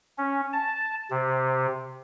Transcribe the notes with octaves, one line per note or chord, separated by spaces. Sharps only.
C#4
A5
C3